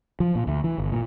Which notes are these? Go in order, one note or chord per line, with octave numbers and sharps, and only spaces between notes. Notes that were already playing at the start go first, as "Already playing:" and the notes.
F3
A#2
D2
E3
G1
A#2